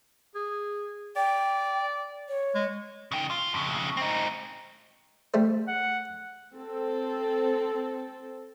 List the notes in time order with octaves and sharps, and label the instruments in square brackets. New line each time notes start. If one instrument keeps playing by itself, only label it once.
[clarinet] G#4
[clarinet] D5 [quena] G5
[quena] C#5
[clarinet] G#3
[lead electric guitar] C#3 G5
F4
F2 C#3
C4 D#4
[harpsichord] G3 A3 C5
[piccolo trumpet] F#5
[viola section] C4 A4